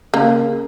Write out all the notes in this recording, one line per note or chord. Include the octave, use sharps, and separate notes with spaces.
C#3 A#3